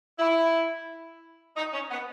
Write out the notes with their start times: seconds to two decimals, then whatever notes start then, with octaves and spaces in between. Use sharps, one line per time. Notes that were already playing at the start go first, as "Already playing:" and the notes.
0.19 E4
1.57 D#4
1.73 C#4
1.91 B3